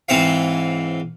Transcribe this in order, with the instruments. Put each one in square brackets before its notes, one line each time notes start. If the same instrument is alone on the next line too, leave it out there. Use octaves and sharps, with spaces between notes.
[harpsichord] G#2 E3 C4 C5 C#5 F5